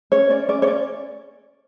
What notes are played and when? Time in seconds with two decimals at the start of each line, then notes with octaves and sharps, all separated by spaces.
0.12 C#4 C#5
0.30 C#4 D5
0.48 C#4 D5
0.62 C#5
0.67 C#4 D5